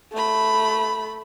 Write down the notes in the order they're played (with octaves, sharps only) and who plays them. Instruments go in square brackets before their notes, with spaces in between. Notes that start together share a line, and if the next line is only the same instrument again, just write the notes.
[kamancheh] A3 B5